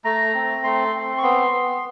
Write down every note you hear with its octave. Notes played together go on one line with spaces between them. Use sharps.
A3 A#5
C4
A3 C6
C4
C#6
B3 C6
B3